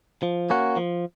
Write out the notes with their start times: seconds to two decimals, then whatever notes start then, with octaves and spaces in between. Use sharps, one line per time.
0.23 F3
0.50 A#3 C#4 F#4
0.77 F3